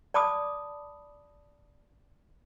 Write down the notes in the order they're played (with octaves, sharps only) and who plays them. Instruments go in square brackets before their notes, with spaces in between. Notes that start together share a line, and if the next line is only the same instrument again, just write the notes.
[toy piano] D5 A5 B5 D6 D#6